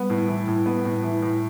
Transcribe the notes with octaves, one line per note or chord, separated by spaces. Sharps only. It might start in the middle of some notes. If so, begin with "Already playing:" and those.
Already playing: G3 B3
A2
E3
A2
B3
A2
E3
A2